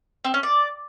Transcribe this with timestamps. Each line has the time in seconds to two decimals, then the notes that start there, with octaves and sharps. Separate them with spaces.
0.25 C4
0.34 C#4
0.43 D5